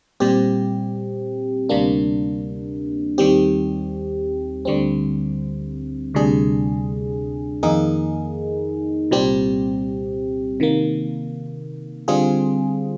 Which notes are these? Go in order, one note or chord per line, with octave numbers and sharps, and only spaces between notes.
A#2 G3 C4 G4
D2 C3 G3 A#3 D4
D#2 D#3 G3 C4 G4
D2 D3 G3 C4
D2 C3 G3 D4 G#4
F2 D#3 A#3 D#4 G#4
C2 A#2 G3 C4 G4
C3 D#3 A#3
D3 G3 C4 F4 G#4